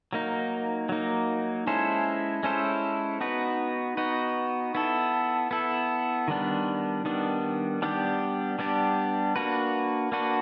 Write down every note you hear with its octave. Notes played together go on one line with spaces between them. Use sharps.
F#3 A#3 D#4
F#3 A#3 D#4
G#3 C#4 E4 A4 C5
G#3 C#4 E4 A4 C5
B3 D#4 F#4 B4
B3 D#4 F#4 B4
B3 E4 A4
B3 E4 A4
D#3 G3 B3 D4
D#3 G3 B3 D4
G3 B3 D4 G4
G3 B3 D4 G4
A#3 D4 F#4 B4
A#3 D4 F#4 B4